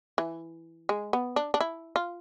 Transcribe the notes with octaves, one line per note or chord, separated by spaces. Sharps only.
E3
G#3
B3
D4
D4
E4
F4